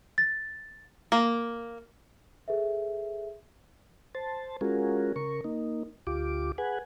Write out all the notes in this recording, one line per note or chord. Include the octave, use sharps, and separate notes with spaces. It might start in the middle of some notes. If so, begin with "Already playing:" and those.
A6
A#3
G#4 A4 B4 E5
C5 A5
G#3 C#4 F4 F#4 G#4 A#4
C#3 A#4 C#6
A#3 D#4
D2 F4 G4 D6
G#4 B4 F#5 G#5